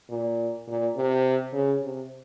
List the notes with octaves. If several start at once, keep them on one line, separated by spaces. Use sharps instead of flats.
A#2
A#2
C3
C#3
C3